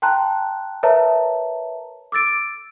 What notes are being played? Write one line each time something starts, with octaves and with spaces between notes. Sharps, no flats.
G5 A5 A#5 C6 F#6
A#4 B4 C#5 E5 A5 A#5
D6 E6 A6 D7